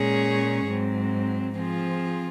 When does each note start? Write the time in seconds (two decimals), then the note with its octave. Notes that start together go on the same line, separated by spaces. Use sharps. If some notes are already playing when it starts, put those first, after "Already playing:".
Already playing: A#2 G#3 C#4 G#4 C#5
0.67 G#2 F#3 C4
1.55 F3 C4 F4 G#4